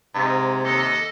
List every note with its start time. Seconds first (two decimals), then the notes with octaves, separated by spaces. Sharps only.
0.15 G#2 C3
0.64 D#2 A4 D#5